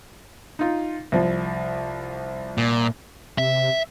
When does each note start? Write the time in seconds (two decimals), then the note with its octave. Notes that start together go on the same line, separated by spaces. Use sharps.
0.59 D#4 F4
1.12 C2 F3
2.58 A#2
3.38 C3 E5